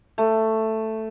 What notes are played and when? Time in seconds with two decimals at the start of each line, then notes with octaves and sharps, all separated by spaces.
0.18 A3